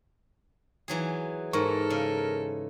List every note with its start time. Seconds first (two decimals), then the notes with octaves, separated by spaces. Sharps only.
0.88 E3 F#3 G#4
1.53 G#2 A4 A#4 C#6
1.90 C#3